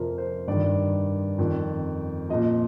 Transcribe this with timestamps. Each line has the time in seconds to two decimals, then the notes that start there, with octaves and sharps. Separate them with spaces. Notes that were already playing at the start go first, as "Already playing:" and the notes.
Already playing: F2 C3 F3 A#4 C5
0.18 C5
0.47 G2 D#3 D5
1.38 F2 D#3
2.29 A#2 F3 D#5